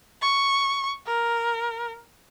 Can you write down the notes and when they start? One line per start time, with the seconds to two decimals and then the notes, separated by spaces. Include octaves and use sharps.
0.22 C#6
1.07 A#4